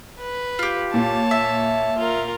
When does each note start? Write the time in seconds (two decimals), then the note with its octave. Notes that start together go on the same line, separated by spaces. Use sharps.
0.19 B4
0.59 F4 G4
0.94 A#2 C#5 A5
1.31 E5
1.98 F4 A#4